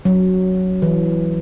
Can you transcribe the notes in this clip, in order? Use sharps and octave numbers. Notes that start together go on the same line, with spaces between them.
F#3
E3